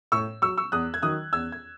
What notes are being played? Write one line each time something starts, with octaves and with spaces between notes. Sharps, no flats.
A2 C#6 E6
F#3 C#6 E6
C#6 E6
E2 D#6 F#6
G#6
D#3 F#3 D#6 F#6
E2 E6 G#6
G#6